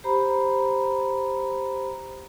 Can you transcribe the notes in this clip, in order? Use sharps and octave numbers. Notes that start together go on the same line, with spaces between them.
G4 C5 A#5 B5